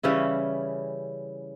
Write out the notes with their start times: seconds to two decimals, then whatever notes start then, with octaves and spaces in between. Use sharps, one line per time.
0.03 C#3 E3 G3 C#4 E4